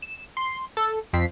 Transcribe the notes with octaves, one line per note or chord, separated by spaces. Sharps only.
E7
C6
A4
F2 C4 B6 C7